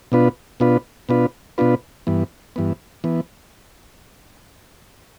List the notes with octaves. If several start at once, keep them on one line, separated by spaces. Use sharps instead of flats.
B2 B3 D4 F4 B4
B2 B3 D4 F4 B4
B2 B3 D4 F4 B4
B2 B3 D4 F4 B4
G2 E3 B3
G2 E3 B3
E3 B3